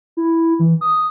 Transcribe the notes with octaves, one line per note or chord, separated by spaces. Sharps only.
E4
E3
D#6